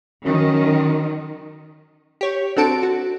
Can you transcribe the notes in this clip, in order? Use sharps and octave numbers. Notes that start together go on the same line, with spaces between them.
F#2 D#3
G4 C#5
C4 D4 F#4 A4 A5 D7
F#4